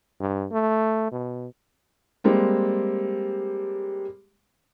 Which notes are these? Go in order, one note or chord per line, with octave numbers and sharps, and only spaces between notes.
G2
A3
B2
G3 G#3 A#3 C4